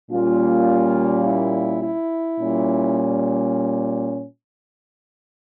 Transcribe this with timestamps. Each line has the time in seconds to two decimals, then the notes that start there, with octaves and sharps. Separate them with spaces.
0.10 A#2 G3 A#3 C#4 F4
1.26 E4
1.83 E4
2.40 A#2 G3 C#4